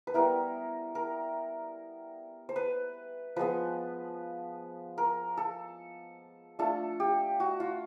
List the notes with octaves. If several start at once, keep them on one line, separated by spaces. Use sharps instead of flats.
B4
G3 B3 E4 A#4
A#4
C5
B4
F3 G#3 B3 B4
A#4
A4
A3 D4 F4 A4
G4
F#4
F4